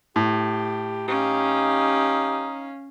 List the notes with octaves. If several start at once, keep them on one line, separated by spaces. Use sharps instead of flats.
A2 G4
C#4 D#4 G4 F5